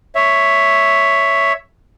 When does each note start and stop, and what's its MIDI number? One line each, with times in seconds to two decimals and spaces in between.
0.15 1.53 73
0.15 1.53 76